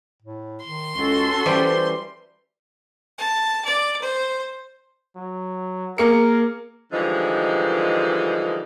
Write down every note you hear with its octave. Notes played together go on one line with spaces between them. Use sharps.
A2
D#3 C6
C#2 C#4 F#4 A4
E3 G3 C5
A5
D5
C5
F#3
A#3 G#4 A#4 C#7
D3 E3 F3 G3 G#3 D#4